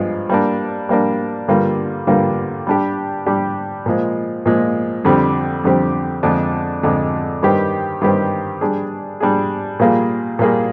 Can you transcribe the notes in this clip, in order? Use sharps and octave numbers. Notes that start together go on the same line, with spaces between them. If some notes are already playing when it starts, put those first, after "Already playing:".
Already playing: G2 F3 G#3
G3 A#3 D4
G3 A#3 D4
G2 D3 G3 A#3 F4
G2 D3 G3 A#3 F4
G3 D4 G4
G3 D4 G4
A#2 F3 G#3
A#2 F3 G#3
F2 D3 G3 C4 G4
F2 D3 G3 C4 G4
F2 D3 G#3 D4
F2 D3 G#3 D4
G2 D#3 G3 C4 G4
G2 D#3 G3 C4 G4
G3 D4 G#4
G3 D4 G#4
A#2 G3 A#3 F4 G#4
A#2 G3 A#3 F4 G#4